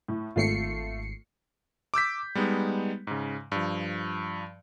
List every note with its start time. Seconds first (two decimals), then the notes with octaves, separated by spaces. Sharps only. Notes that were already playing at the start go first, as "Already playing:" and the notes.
0.08 A2
0.36 G#1 A3 F4 C7 C#7
1.94 D6 E6 G6 B6
2.35 G3 G#3 B3 D#4
3.07 G#2 C#3
3.52 G2 F3